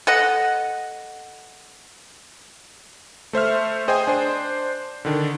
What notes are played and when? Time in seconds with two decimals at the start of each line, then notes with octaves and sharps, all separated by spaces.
0.07 A4 D#5 F#5
3.33 A3 C5 E5 F6
3.88 G#4 C5 D#5 G5 G#5 D#6
4.07 D4 C5
5.05 D3 D#3 D4